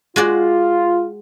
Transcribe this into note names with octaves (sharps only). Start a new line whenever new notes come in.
G#3 F4 F#4 D5